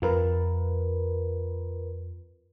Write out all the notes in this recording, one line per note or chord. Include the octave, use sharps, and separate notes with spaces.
F2 F4 A#4 B4